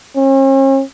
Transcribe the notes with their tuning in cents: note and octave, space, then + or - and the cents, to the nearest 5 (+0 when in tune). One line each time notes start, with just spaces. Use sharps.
C#4 -45